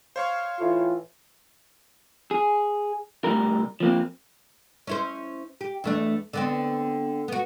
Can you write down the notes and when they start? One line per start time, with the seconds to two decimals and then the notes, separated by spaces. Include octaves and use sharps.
0.16 C5 C#5 F5 C#6
0.60 A2 E3 F4
2.31 G#4
3.24 C2 A2 D#3 G3 A#4
3.80 F3 A#3 C4
4.87 C#4 E4 C5
5.61 G4
5.84 E2 A3 D4
6.33 D3 B3 C4
7.28 B3 F#4